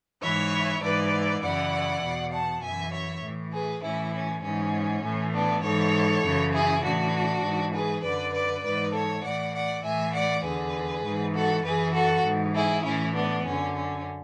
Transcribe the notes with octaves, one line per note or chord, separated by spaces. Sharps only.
G#2 E3 C#5 E5
G#2 E3 B4 D5
F#2 C#3 E3 D5 F#5
E2 B2
F#5 A5
F#2 E3 E5 G#5
C#5 E5
A2 E3
G#4 B4
A2 E3 C#4 E4
C#4
G#2 E3 C#4
A2 E3
B3 D4
G#2 E3 A4 C#5
F#2 C#3 E3
E4 G#4
A2 E3 D4 F#4
G#2 E3
G#4 B4
F#2 D3 B4 D5
B4 D5
G#2 E3 B4 D5
A4 C#5
A2 E3 D5 F#5
D5 F#5
A2 E3 E5 G#5
D5 F#5
E2 D3 G#4 B4
G#2 E3
F#4 A4
F#2 E3 G#4 B4
F#4 A4
G#2 E3
E4 G#4
A2 E3 C#4 E4
B3 D4
F#2 D3 C#4
C#4